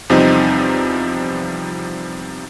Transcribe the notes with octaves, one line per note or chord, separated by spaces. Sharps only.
E2 C3 F3 G3 C4 D#4